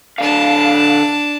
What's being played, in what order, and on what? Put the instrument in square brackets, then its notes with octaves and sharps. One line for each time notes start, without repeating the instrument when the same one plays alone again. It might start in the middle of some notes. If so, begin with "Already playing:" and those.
[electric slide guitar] D3 F5 [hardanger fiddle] D4 A5